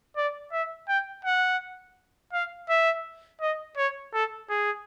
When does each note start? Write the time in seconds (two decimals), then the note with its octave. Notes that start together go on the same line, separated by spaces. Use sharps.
0.17 D5
0.52 E5
0.88 G5
1.25 F#5
2.33 F5
2.69 E5
3.41 D#5
3.77 C#5
4.13 A4
4.49 G#4